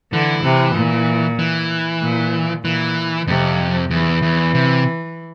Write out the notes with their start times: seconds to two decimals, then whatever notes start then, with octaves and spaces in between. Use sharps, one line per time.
0.12 D3 E3
0.44 C3
0.76 A#2
1.39 E3
2.02 A#2
2.64 A#2 E3
3.27 F2 C3
3.90 E2 E3
4.22 E2
4.54 C3